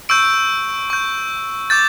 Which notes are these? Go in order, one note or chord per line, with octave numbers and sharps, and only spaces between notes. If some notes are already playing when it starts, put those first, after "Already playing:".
C#6 E6 G6 D7
C#6 G6
D6 G6 A6